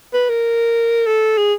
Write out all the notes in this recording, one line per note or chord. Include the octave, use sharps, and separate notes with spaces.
B4
A#4
A4
G#4